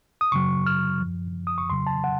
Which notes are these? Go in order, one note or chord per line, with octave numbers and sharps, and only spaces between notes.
D#6
F#2 C#3 F#3 C#6
F6
F#2 F3
D#6
C#6
F2 C#3 F#3 C6
A5
F#5